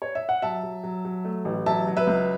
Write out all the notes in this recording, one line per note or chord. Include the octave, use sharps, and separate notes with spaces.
C#5
E5
F#5
F#3 E5 A5
F#3
F#3
F#3
A3
A1
F#3 E5 A5
F#3
B4 E5
C#2